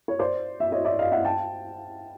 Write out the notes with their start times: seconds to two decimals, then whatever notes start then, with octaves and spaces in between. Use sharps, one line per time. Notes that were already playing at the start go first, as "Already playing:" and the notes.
0.08 C#5
0.19 C5 D5
0.60 E5
0.72 C#5 D#5
0.85 D5 E5
0.99 D#5 F5
1.12 E5 F#5
1.25 G5 A5